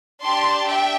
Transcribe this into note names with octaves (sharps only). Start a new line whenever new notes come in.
D4 G4 A5 C6
E5 G5